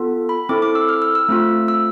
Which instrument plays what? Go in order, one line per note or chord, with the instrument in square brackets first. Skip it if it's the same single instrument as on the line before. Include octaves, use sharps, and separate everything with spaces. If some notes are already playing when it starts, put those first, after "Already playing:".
Already playing: [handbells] B3 F4 A4
B5
C4 E4 A4 D6
D6
E6
F6
E6
E6
A3 C4 F4
E6